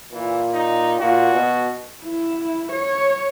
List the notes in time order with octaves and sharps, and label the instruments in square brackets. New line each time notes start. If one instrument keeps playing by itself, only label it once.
[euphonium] A#2 [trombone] E3
[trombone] D#4
[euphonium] A#2 [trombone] F#4
[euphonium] B2
[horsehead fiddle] E4
C#5